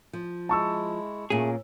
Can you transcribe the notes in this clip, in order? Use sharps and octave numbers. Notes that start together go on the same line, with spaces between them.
F3
G#3 E4 A5 C#6 E6
A#2 A3 C#4 G#4